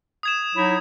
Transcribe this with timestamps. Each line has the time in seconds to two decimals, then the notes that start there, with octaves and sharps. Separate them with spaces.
0.23 D#6 G#6 E7
0.56 F#3 D#4 E4